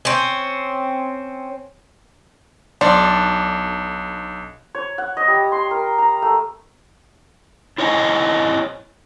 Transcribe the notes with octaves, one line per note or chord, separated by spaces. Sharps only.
C4 C#4
B1 D4 C6
C#5
F#5
D#5
G3
C6
A#4
A#5
A3
E4 C5 C#5 D#5 F#5 G#5